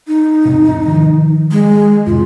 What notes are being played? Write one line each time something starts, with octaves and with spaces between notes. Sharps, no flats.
D#4
E1 G#2 C3
D#3 F3
G#3
F2 A2 C3 F4